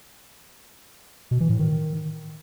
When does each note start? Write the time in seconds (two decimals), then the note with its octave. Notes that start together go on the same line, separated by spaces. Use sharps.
1.31 B2
1.40 E3
1.50 A2
1.59 D#3